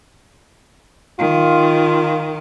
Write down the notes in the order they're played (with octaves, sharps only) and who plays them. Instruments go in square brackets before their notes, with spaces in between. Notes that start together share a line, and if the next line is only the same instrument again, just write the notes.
[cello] D#3 [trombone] F4